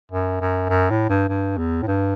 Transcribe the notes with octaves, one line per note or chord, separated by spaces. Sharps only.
F#2
F#2
F#2
A2
G2
G2
E2
A2
G2